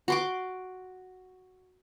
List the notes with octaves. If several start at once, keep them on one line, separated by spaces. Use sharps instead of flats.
F#4 C6 D6